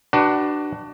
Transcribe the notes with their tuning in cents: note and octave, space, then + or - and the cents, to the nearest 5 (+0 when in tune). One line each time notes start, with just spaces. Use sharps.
D4 +15 F#4 +30 B4 -15